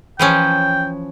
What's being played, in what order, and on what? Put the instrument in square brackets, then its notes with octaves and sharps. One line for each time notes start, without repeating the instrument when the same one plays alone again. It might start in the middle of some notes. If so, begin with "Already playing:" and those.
[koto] E3 F3 C#4 [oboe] G5